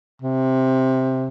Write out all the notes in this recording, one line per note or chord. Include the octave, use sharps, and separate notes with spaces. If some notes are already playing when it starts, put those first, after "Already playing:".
C3